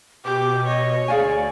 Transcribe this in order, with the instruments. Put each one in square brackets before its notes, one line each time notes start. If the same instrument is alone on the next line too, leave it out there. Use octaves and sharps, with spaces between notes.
[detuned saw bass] B2 [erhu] G4 [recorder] D6
[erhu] C#5 [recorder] D#5
[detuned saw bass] D2 [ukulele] G#4 F5 G#5 [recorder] D5